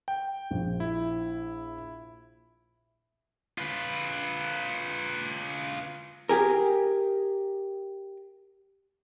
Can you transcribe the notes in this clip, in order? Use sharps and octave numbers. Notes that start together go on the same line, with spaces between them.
G5
A#1
E4
F4 B4
G4 G#4 A#4